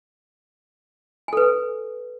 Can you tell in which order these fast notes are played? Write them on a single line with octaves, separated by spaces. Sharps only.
G#5 A4 B4